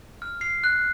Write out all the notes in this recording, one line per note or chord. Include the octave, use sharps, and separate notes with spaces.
F6
C7
F#6